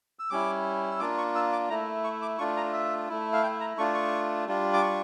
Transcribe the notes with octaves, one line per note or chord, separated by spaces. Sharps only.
E6
G3 C#4 E4 D6
E6
A#3 D4 F4 D6
C#6
E6
D6
A3 E4 A#5
C#6
D6
A3 D4 F4 C#6
A#5
E5
A3 E4
F5
G5
A#5
A3 D4 F4 C#6
C#6
G3 D4 F4
D6
C#6